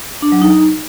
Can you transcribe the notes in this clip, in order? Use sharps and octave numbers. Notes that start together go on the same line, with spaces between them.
D4
F#3
D#4